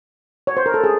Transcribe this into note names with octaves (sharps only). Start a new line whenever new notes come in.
C#5
C5
A#4
A4
G#4